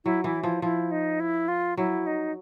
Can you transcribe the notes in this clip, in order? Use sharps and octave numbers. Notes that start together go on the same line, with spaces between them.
F#3 E4
E3 E4
F3 E4
F3 E4
D#4
E4
F4
F#3 E4
D#4